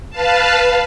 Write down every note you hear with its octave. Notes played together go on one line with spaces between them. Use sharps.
B4 F5 A5